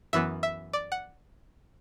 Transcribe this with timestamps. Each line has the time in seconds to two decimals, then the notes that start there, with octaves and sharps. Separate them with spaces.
0.13 F#2 E3 B3 E5
0.43 E5
0.73 D5
0.92 F#5